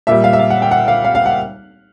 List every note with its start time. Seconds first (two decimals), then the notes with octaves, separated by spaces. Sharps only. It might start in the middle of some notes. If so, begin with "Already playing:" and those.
0.07 A#2 G3 E5
0.24 F5
0.33 E5
0.39 F5
0.50 F#5
0.62 G5
0.71 F#5
0.88 F5
1.04 F5
1.15 F5
1.26 F#5